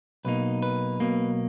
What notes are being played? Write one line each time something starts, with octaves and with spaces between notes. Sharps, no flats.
B1 B2 A#3 D#4 B4
B4
B1 B2 A#3